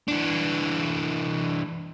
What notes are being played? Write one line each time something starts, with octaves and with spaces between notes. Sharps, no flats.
E3 D4